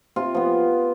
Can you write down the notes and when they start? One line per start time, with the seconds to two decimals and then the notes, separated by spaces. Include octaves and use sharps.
0.16 C3 F4
0.35 F3 B3